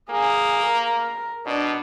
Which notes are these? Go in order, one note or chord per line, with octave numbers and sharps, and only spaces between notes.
A#3 G#4
A#4
B2 D4